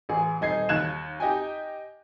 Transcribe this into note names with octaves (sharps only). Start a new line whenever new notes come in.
A1 G#4
D#1 D#4 G#6 C7
D#2 F#6 G#6 E7
D#4 G4 D#5 G5 G#5